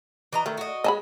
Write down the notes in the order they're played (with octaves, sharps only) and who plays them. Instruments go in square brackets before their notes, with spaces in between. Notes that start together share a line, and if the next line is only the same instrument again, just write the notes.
[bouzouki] E3 D#5 A#5
[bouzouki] D#3 [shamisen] A3
[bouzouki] F#4 D#5
[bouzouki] G#3 [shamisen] D#5 A5 B5